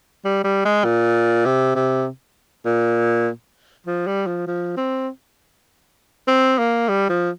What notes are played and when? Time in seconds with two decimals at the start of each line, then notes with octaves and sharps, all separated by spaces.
0.25 G3
0.44 G3
0.65 G#3
0.85 A#2
1.46 C3
1.75 C3
2.66 A#2
3.87 F3
4.07 G3
4.27 F3
4.47 F3
4.77 C4
6.28 C4
6.59 A#3
6.89 G3
7.10 F3